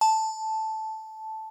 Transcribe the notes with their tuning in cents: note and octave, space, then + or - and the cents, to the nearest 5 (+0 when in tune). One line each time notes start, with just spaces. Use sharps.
A5 -5